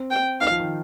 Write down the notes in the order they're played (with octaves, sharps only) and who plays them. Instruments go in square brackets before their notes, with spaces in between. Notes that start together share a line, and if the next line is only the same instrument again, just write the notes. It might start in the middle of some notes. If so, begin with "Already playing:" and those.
Already playing: [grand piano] C4
[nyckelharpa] G5
[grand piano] D#4 [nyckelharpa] F5
[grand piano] F3
D#3